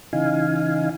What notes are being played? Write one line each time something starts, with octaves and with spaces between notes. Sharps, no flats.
C#3 E3 D#4 F5 G#5